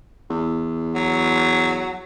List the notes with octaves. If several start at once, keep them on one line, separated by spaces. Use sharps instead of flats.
E2
F#3